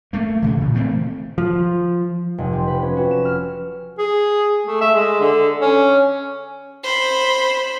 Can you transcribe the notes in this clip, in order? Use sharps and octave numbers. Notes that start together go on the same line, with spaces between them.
A3 A#3
G2 C#3 E3
A#2
E3 A3 A#3 C4
F3
F1
C4
B4
C#4
F#4
E7
F6
G#4
A3
E5
G#3
D3
C#4
C5 B5